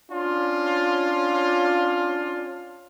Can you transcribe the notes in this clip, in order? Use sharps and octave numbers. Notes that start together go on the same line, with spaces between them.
C#4 D4 F4